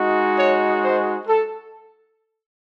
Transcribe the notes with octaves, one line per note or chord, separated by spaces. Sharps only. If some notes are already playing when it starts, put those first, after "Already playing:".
Already playing: G#3 D#4 F#4
C#5
C5
A4